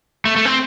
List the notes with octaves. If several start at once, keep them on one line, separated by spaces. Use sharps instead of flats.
A3
A3
C4